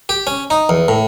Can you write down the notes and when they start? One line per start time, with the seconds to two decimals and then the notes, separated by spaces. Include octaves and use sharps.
0.09 G4
0.27 C#4
0.50 D#4
0.69 E2
0.88 A2